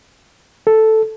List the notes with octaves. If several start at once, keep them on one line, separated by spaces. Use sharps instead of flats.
A4